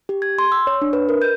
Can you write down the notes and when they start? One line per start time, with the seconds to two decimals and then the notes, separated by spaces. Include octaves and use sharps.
0.09 G4
0.22 G#6
0.39 C6
0.52 E6
0.67 C#5
0.82 D4
0.93 B4
1.09 A#4
1.22 G6